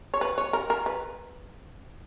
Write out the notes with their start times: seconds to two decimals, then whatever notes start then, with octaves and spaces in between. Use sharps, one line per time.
0.14 C#5
0.21 B4
0.38 C#5
0.53 A#4
0.70 A#4
0.86 B4